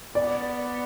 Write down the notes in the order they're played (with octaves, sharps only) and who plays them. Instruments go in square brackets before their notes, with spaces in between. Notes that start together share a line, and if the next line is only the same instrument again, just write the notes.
[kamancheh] B3 [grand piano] D5